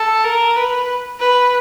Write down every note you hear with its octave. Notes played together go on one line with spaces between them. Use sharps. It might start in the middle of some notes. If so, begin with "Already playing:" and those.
Already playing: A4
A#4
B4
B4